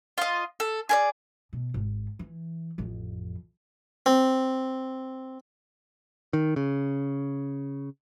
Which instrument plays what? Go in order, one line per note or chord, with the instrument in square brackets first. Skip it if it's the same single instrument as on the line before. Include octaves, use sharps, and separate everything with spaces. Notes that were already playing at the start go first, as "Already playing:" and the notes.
[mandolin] F4 D#5
A4
G#4 A#4 D5
[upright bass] B2
G#1
E3
A1 F2
[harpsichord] C4
[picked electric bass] D#3
C#3